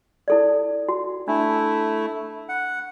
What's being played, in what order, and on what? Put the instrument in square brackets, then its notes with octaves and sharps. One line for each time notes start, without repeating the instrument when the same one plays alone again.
[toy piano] E4 A4 D5
F#4
[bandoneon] A3 E4 [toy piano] D4
[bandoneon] F#5